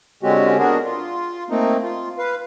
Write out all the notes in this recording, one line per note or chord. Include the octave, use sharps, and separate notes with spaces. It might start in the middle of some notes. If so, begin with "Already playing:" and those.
D3 G#3 C4 C#4 F#4 G4
B3 D4 F#4 G#4 A#4
F4
A3 A#3 C4 D#4
F4
B4 F5